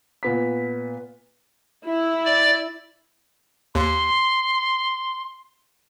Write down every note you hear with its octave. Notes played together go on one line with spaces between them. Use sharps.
A#2 B3 B6
E4
D5
D#2 C6